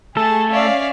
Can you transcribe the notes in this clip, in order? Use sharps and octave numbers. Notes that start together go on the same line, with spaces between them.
A3 G#4 A4 A5
C#4 C#5 D5 E5 F5